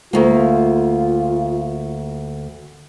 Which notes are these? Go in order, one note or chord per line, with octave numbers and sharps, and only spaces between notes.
D2 A#3 F4